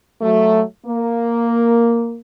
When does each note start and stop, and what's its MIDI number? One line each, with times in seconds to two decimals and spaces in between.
0.21 0.62 54
0.21 0.62 57
0.86 2.20 58